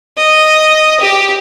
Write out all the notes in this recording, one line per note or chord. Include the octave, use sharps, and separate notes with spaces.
D#5
G4